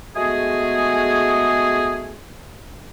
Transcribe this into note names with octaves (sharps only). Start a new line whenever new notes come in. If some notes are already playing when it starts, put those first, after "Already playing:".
G#3 A3 B3 F#4 G#4